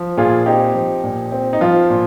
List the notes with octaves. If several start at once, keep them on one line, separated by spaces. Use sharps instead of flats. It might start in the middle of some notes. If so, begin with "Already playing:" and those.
Already playing: F3
A#2 F4 G#4
C4 D#4 G4
F3
A#2
C4
D#4
F3 F4
A#2